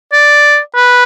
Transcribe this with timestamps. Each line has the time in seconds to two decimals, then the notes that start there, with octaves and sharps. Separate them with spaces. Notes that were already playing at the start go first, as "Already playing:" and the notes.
0.13 D5
0.76 B4